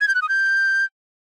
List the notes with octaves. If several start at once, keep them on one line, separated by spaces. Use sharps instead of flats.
G#6
G6
F#6
D#6
G6